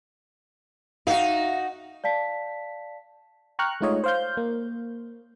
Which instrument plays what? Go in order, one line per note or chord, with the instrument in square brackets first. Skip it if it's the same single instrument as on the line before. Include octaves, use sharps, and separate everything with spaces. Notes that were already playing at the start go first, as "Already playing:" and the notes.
[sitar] D#4 F#4 [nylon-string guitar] E5 F5
[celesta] D5 F5 A5 B6
[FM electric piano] G5 A#5 C#6 F6 F#6
G#3 A3 D#4 F4 C#5 D#5
C5 F5 G6
A#3